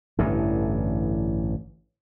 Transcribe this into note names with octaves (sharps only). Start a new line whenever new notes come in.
A1 G2 D3 E3